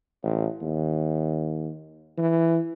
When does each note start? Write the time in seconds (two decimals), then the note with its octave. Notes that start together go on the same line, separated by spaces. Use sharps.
0.23 A1
0.62 D#2
2.18 E3